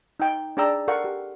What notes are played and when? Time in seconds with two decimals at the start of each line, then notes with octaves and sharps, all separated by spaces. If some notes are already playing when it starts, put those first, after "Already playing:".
0.20 D#4 G5
0.57 D4 G#4 D5 G5 A#5 E6
0.88 A4 A#4 D5 F5 F#5 C#6
1.04 G4